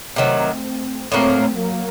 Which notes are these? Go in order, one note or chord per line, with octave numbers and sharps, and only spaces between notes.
C3 D#3 F#3 A3 C4
A2 F#3 A3 A#3 C4
F#3 A#3